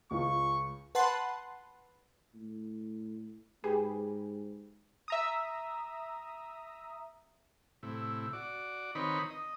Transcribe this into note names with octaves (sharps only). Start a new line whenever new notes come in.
C#2 F4 C#6
B4 F#5 A5 C6
A2
G#2 G4 G#4 B4
E5 A#5 D#6
A2 C3 E4
F#4 D5
D#3 C4 D#4 B4 C#5 B5
D#5